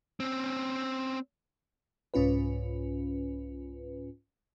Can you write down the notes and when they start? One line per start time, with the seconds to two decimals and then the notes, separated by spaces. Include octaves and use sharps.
0.20 C4 C#4
2.14 C2 G#2 C#4 F4 B4